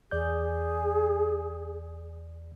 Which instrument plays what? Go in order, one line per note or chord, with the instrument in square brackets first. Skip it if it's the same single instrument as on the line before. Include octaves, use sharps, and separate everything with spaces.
[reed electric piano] E2 D5 G6 [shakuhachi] G#4